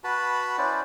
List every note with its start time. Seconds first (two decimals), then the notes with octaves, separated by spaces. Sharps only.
0.04 F#4 B4 A5 B5
0.58 C#4 E4 C5 D5